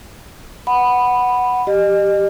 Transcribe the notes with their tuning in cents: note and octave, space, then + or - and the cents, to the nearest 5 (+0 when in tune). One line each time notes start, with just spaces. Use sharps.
F#5 +0 B5 +0
G4 +0 D#5 -35